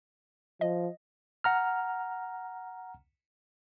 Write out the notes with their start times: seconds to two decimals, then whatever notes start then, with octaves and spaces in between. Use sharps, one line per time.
0.61 F3 D#5
1.44 F#5 A#5 F6